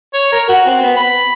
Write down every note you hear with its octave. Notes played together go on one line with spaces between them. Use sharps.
C#5
A#4
F#4
C4
B3
B5